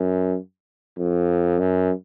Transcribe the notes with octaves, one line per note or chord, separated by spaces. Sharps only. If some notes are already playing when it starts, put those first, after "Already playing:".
Already playing: F#2
F2
F#2